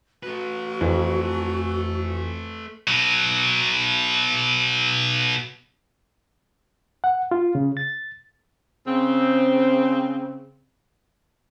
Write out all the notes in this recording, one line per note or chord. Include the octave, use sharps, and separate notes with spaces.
A3 F#4 B4
F2 E3
B2 F#3
F#5
F4
C#3
A6
C#3 C4